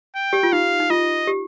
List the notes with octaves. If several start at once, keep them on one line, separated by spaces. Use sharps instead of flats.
G5
G4
F4
D#4 F5
D#4
F4 D#5
G4